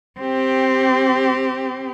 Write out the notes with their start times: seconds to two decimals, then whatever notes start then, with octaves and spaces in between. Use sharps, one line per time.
0.20 C4 G4